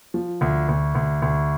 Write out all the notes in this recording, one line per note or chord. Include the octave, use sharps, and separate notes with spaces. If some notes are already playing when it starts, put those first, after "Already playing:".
F3
D2
D2
D2
D2